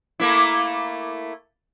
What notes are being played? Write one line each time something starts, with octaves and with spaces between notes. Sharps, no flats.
A3 A#3 E4